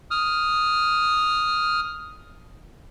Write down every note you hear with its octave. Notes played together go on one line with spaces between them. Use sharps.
D#6 F6